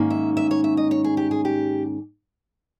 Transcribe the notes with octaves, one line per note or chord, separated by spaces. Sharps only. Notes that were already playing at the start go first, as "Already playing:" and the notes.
Already playing: G#2 D#3 A#3 C#4
E5
E5
C#5
E5
D#5
C#5
G#4
G4
G#4
G4